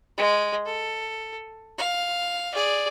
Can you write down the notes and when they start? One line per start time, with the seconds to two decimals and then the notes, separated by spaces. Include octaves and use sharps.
0.18 G#3
0.66 A4
1.78 F5
2.54 G#4 D5